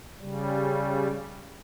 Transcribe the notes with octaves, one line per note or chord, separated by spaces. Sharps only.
C#3 G3